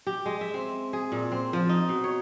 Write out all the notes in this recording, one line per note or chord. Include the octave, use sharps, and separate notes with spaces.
G4
G#3
E5
C4
G#4
A#2
C4
F3
D#4
B2
C#5